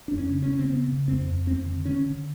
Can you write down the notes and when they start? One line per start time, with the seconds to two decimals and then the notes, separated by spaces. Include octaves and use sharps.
0.08 F2 D4
0.17 C#4
0.30 C#3
0.42 C#4
0.49 C#3
0.59 C4
0.69 C#3 B3
0.88 C#3
1.08 F2 C4
1.27 F2
1.46 F2 C4
1.66 D3
1.85 D3 C#4
2.06 D3